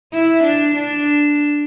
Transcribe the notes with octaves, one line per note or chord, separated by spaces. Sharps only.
E4
D4
D4